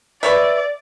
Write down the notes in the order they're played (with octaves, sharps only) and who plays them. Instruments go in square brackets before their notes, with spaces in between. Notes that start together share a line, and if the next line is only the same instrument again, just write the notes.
[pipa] B4 C#5 E5 [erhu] D5